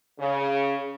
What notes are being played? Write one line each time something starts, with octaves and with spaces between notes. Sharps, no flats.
C#3